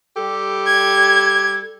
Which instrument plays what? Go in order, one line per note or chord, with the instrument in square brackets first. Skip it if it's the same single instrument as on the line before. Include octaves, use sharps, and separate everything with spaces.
[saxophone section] G3 G4 A4
[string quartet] G#6